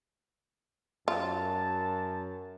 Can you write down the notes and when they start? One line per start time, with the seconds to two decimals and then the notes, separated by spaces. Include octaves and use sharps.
1.08 F#2 F4 A5